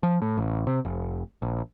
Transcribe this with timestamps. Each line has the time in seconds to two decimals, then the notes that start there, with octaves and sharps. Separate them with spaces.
0.03 F3
0.22 A2
0.37 A1
0.67 C3
0.85 F1
1.42 A#1